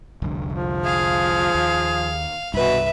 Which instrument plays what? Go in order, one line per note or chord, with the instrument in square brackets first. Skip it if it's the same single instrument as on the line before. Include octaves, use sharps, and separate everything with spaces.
[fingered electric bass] F1 C2 D3
[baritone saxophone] F3
[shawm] G#4 [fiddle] F5
[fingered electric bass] D#2
[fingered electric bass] C2 G2 [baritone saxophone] B2 [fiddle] B4 E5